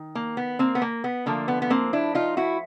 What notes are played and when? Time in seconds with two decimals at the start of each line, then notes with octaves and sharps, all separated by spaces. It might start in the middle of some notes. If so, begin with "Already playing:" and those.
Already playing: D#3
0.15 A#3
0.37 B3
0.59 A#3 C4
0.75 B3
0.82 A#3
1.04 B3
1.26 D3 F3 A3 A#3
1.48 B3
1.62 B3
1.70 A#3 C4
1.93 D4 E4
2.15 D#4 F4
2.37 E4 F#4